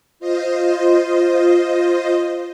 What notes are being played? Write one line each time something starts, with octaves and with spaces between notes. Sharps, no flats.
F4 C5 D#5